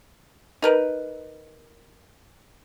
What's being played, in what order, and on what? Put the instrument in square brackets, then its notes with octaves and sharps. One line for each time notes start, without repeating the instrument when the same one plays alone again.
[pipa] D#4 A#4 B4